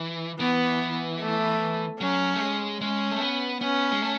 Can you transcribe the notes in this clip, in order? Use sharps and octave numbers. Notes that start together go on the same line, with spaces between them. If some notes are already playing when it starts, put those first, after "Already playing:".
Already playing: E3
E3 B3
A3
F#3 C#4
A3
G#3
G#3 C#4
A3
B3
B3 C#4
G#3
A3